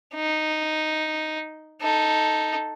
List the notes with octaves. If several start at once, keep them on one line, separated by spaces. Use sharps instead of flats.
D#4
D#4 A4